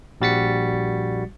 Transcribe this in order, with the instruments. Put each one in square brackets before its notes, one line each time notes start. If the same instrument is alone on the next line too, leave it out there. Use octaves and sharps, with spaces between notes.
[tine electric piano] A#1 G3 F#4 A6 B6 C#7